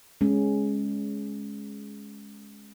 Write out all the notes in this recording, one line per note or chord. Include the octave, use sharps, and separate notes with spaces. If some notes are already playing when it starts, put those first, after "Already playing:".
G#3 C#4